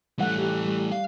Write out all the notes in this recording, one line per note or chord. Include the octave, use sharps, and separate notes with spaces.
E3 G3 A3 F#5
G4
G3
F5